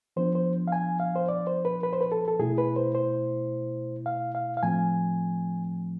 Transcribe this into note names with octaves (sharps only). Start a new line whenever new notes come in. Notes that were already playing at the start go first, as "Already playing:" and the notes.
F3 B3 D4 C5
C5
F5
G#5
F5
C5
D5
C5
B4
B4
C5
B4
A4
A4
B2 A3 E4 G#4
B4
C5
C5
F5
F5
F5
A2 F3 A3 C4 G#5